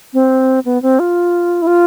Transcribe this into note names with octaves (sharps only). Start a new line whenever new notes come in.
C4
B3
C4
F4
E4
F4